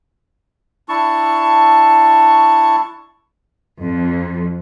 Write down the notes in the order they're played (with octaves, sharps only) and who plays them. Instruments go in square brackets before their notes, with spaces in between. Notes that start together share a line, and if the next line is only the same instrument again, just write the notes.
[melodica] D4 E4 A5 C#6
[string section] F2